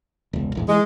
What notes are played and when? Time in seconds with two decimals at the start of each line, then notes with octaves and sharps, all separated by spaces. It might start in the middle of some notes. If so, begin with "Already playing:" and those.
0.33 E1 C#2
0.55 A#1 E2 G#2
0.68 E3 G#3